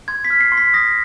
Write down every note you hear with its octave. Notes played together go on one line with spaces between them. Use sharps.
C6 G#6
B6
F6
C7
C6
B6
D#6 A#6